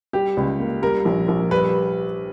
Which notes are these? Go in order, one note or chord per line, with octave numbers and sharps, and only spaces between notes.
G3 G4
C#2
A#3
G3 A#4
A#1
A#1
G3 B4